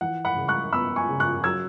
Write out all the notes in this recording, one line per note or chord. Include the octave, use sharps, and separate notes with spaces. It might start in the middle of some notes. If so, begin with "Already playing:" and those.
E3 F#5
F#5 B5
C#3
C#6 F#6
B3 B5 E6
G#5 C#6
C#3
C#6 F#6
F#3 E6 G#6